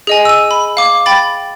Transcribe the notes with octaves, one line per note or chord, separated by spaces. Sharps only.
G#4 D#5 G#5
E6 D#7
B5
F5 D6
G5 B5 A6